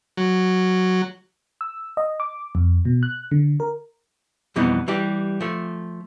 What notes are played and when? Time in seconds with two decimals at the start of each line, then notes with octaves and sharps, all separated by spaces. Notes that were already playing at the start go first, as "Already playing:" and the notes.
0.17 F#3
1.61 E6
1.97 D#5
2.20 D6
2.55 F2
2.85 B2
3.03 F#6
3.31 D3
3.60 A#4
4.56 F2 B2 E3 G3 B3 D#4
4.88 E3 G3 G4
5.41 F3 A3